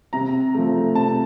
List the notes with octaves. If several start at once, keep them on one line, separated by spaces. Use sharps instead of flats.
C3 A#5
F3 A3
C3 A5